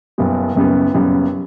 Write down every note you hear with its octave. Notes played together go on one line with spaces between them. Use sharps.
F#1 F#2 C#3 G3 B3
F#1 F#2 C#3 G3 B3
F#1 F#2 C#3 G3 B3